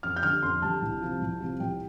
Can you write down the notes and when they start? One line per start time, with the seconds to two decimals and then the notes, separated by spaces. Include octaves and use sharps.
0.03 F2 F6
0.16 G6
0.23 D3 G3 F6
0.43 F2 C6
0.62 D3 G3 A5
0.82 C2
1.01 C3 F3
1.21 C2
1.41 C3 F3
1.60 C2 G5